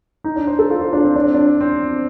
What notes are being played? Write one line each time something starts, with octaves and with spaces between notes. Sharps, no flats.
D#4
D4
C5
A4
F4
F4
D4
C4
D4
C4
D4
C4